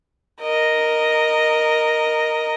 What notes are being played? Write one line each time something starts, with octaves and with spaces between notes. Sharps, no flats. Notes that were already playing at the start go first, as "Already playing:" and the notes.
A#4 D#5